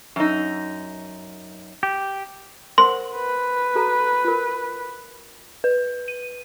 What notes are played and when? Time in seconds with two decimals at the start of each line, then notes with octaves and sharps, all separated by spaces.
0.16 F#2 D#4
1.83 G4
2.78 A#4 C5 F#5 C6
3.15 B4
3.75 F#4 A4 A#5
4.25 F4 A#4
5.64 B4
6.08 D#7